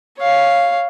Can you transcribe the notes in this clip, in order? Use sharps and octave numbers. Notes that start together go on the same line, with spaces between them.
C#5 F5